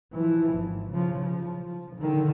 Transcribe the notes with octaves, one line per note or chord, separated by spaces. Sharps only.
E3 F3
G#1
C#3 F3
F3
F3
D3 D#3